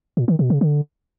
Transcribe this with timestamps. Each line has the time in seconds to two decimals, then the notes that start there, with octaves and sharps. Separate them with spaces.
0.17 A#2
0.28 D#3
0.39 B2
0.50 C#3
0.61 D3